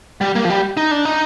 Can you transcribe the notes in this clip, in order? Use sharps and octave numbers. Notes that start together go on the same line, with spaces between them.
G3
A#3
F3
G3
D#4
D4
D#4